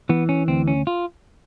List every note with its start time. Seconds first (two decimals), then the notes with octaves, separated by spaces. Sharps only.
0.09 E3 B3
0.29 C#4
0.48 D2 C4
0.68 C#4
0.87 F4